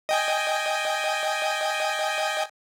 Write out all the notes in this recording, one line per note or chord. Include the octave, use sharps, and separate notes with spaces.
D#5 G5 G#5